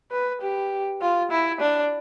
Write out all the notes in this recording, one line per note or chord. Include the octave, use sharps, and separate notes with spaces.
B4
G4
F4
E4
D4